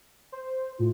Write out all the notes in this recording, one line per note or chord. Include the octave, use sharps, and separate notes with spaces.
C5
A2 F4